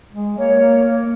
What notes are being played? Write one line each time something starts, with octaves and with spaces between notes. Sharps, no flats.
G#3
A#3 C#5
A#3
A#3